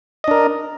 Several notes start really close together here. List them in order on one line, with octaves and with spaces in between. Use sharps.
D#5 D4 A#4